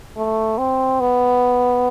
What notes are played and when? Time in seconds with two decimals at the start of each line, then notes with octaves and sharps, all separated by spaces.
0.17 A3
0.58 C4
1.00 B3